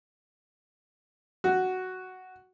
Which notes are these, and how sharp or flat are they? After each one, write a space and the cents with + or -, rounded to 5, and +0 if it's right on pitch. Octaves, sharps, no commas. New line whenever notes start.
F#4 +5